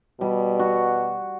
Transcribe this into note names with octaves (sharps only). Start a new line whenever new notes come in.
B2 G3
F#4